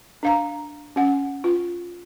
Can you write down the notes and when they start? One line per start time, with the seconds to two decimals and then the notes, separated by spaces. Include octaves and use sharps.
0.23 D4 F5 A#5
0.96 C#4 F#5
1.44 F4